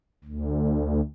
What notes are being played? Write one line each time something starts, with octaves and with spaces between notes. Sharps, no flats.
D2